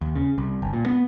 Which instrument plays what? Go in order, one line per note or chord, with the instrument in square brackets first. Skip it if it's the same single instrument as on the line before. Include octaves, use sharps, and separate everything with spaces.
[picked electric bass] D#2
C#3
C2
G1
A#2
B3